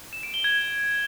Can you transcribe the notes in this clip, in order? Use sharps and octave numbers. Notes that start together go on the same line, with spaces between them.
E7
D7
G7
G#6